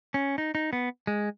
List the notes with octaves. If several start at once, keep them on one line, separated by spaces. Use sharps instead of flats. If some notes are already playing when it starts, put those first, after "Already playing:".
C#4
D#4
D#4
B3
G#3